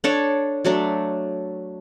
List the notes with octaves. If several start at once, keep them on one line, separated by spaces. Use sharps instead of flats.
D4 A4 C#5
F#3 A3 D4